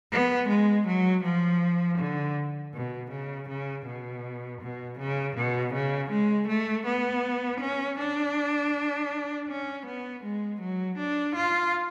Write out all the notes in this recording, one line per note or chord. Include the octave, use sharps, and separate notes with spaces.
B3
G#3
F#3
F3
D3
B2
C#3
C#3
B2
B2
C#3
B2
C#3
G#3
A3
B3
C#4
D4
C#4
B3
G#3
F#3
D4
F4